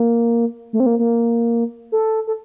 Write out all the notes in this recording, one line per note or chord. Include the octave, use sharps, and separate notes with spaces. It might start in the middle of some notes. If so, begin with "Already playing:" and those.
Already playing: A#3
A3
C4
A#3
A#3
A4
A4